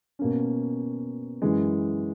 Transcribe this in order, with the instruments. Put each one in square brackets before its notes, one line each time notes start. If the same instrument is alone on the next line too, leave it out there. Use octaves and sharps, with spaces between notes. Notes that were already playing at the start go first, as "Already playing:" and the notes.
[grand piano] B2 A#3 C#4
F#2 E3 G#3